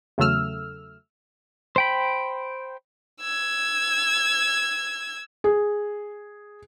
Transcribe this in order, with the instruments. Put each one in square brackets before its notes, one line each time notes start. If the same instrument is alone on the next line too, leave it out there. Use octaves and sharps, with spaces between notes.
[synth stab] E2 C#3 F#3 A3 E6 F6
[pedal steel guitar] C5 G5 B5
[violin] E6 G#6
[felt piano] G#4